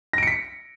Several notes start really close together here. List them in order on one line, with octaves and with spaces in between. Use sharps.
A#6 D7 C#7 B6